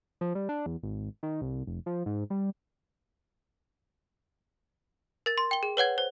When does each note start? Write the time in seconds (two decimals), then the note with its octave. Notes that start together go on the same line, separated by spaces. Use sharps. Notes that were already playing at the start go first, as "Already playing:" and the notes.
0.21 F3
0.35 G3
0.49 D4
0.66 E2
0.83 G#1
1.23 D#3
1.42 C2
1.67 F1
1.86 F3
2.06 G#2
2.30 G3
5.26 A#4 A6
5.38 C6
5.51 G5 G7
5.63 G#4
5.77 B4 C#5 F#5 G#6
5.98 C5